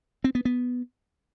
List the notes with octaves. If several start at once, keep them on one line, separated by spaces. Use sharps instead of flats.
C4
B3
B3